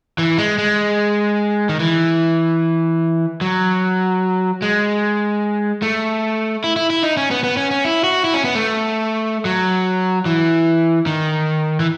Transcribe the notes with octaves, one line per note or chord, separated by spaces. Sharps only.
E3
G#3
G#3
D#3
E3
F#3
G#3
A3
E4
E4
E4
D#4
C#4
B3
B3
C#4
C#4
E4
F#4
E4
C#4
B3
A3
F#3
E3
D#3
E3